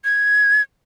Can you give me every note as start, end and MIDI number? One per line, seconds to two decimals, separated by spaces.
0.05 0.62 92